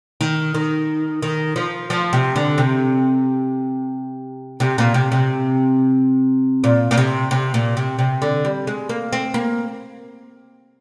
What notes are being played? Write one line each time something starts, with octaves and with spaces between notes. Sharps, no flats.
D#3
D#3
D#3
F3
F3
C3
D3
C3
C3
A#2
C3
C3
A#2
A#2
C3
C3
A#2
C3
C3
D3
G3
G#3
A#3
C4
A#3